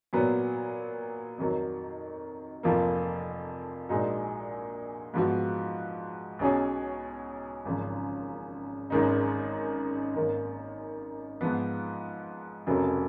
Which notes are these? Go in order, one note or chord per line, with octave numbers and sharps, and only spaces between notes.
A#2 F#3 B3
F2 D#3 F#3
F1 F2 F3 A#3 F4
A#1 A#2 G#3 D#4 F#4
G#2 F3 B3 F#4
B1 B2 F#3 C#4 G#4
G#1 F#2 C#3 F3
G#1 F#2 D#3 G#3 D#4
G#1 F#2 D#3 A#3
G#2 F3 B3
F1 F2 C#3 F#3 A#3